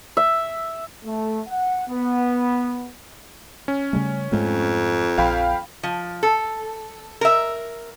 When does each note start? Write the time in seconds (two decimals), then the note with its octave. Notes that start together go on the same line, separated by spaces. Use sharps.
0.17 E5
1.05 A3
1.48 F#5
1.89 B3
3.68 C#4
3.93 C#3 G3 A3
4.32 F2 G#2 G#3 A3
5.18 A#1 F5 G5 B5
5.83 F3
6.23 A4
7.21 A#4 E5